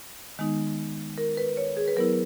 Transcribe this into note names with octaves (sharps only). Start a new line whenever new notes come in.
D#3 G#3 B3 D#4
A#4
B4
C#5
G#4
B4
F#3 B3 E4 A#4